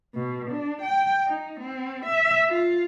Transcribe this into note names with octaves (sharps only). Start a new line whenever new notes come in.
B2
D4
G5
D#4
C4
E5
F4